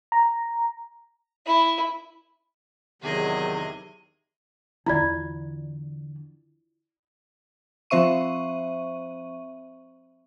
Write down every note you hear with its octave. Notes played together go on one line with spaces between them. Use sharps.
A#5
E4
E2 C3 D#3 F#3 G#4 D#5
E2 D3 E4 F4 D5
F3 C4 C5 E5 C#6 D#7